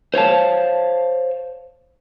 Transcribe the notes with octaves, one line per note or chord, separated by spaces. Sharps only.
C5 C#5 F5 A5